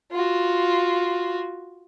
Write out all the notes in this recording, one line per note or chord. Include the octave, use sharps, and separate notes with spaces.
F4 F#4